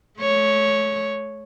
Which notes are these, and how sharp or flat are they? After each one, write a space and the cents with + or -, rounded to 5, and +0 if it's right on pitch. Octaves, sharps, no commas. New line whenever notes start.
A3 -40 C#5 +0